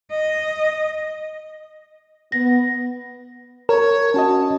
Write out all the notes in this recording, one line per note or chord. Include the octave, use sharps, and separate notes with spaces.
D#5
B3 A#6
A#4 C#5
C#4 F#4 D#5 A5